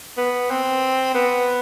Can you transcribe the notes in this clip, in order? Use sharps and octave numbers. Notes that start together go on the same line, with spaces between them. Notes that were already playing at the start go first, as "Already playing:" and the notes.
B3
C4
B3